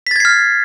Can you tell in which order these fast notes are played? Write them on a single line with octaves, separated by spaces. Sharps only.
B6 A6 G#6 C7 F6